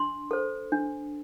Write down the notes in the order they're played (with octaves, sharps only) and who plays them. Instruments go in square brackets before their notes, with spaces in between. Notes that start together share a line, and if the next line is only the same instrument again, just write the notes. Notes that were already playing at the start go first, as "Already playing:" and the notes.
Already playing: [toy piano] D4 C6
A4 C5
D4